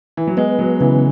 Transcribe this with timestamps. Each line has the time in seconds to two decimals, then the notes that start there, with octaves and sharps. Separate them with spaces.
0.17 E3
0.27 F#3
0.37 G#3 B3
0.59 F#3
0.81 C#3 E3